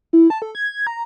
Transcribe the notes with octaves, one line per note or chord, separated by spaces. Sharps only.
E4
A5
A4
G#6
A#5